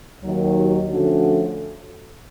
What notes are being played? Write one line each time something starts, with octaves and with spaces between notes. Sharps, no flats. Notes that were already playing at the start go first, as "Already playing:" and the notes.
D#2 D#3 F#3
D3 F3 A3 C#4 F#4